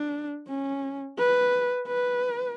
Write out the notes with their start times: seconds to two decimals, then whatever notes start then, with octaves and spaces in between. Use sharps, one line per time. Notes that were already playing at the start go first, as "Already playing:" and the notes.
Already playing: D4
0.48 C#4
1.18 B4
1.88 B4